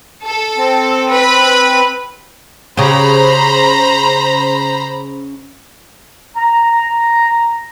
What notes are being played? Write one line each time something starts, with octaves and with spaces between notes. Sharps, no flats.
A4
C4
B4 B5
C#3 G4 C5 A#5 B5
A#5